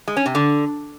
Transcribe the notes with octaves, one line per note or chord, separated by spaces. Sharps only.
G#3
C#4
C3
D3